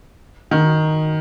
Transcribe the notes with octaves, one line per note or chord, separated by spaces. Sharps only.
D#3